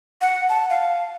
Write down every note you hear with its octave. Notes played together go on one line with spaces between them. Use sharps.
F#5
A5
F5